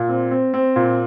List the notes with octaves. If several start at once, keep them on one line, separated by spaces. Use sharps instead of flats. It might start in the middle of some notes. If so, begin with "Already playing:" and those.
Already playing: A#2
C4
C4
C4
A#2